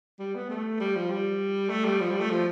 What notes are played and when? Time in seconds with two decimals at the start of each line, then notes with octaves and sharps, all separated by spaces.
0.19 G3
0.35 B3
0.50 A3
0.80 G3
0.95 F3
1.10 G3
1.70 A3
1.85 G3
2.00 F3
2.10 G3
2.20 A3
2.30 F3